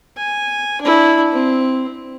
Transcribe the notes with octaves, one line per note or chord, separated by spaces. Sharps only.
G#5
D4 E4
C4